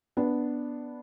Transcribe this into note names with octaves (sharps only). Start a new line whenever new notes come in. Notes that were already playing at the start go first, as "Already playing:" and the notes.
B3 D4